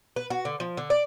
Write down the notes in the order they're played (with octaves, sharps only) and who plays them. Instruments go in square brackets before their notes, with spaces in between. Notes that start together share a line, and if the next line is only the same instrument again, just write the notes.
[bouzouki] B4
F#4
D3
F3
D3
D5